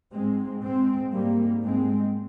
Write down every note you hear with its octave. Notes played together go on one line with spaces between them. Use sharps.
G#2 G#3 C4
G#3 C4
G#2 G3 A#3
G#3 C4